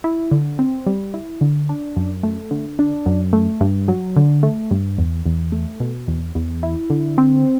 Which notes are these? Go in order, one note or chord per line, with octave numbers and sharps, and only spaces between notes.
E4
D3
C4
G3
E4
D3
D4
F#2
A3
D3
D4
F#2
A3
G2
F#3
D3
A3
G2
E2
E2
A3
B2
E2
E2
E4
D3
C4